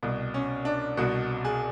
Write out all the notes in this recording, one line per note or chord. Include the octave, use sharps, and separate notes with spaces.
C2 B2
C#4
D4
C2 B2 F#4
G#4